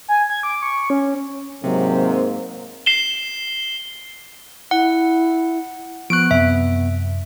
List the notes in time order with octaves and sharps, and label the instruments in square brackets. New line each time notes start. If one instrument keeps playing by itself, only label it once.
[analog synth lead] G#5
G#6
D6
C#6
C#4
[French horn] G#2 [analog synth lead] C3 [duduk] F#3 [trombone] A#3
[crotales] C7 E7 G7
[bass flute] E4 [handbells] F#5
[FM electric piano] F3 C#6 [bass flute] B3 [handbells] F#6 D7
[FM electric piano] F#2 C3 [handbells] E5